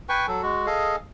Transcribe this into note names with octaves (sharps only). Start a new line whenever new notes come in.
B4 G5 G#5 C#6
F#3 A4
G#3 F#4
G#4 A4 D#5 F5